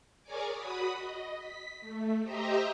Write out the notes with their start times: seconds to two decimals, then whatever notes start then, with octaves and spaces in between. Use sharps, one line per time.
0.23 G#4 A#4 C#5 D5 G#5 D6
0.54 F#4 B5 D#6
0.97 D#5
1.38 B6
1.81 A3
2.22 G4 C5 D#5 E5 A#5